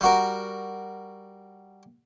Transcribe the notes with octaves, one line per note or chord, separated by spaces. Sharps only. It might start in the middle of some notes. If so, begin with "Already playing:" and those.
G3 F#4 A#4